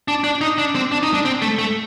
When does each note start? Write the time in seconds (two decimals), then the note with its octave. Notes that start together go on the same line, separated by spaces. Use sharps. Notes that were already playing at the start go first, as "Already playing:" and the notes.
0.08 D4
0.24 D4
0.41 D#4
0.58 D4
0.75 C4
0.92 D4
1.03 D#4
1.14 D4
1.25 C4
1.42 A3
1.59 A3